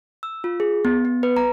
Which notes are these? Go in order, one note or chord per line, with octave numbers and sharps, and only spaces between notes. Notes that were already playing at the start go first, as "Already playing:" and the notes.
E6
F4
G#4
B3
B3
B4
A#5